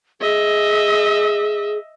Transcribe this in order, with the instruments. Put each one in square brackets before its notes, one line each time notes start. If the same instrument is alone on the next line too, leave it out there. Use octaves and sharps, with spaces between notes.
[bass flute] G#4 [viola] D#5 E5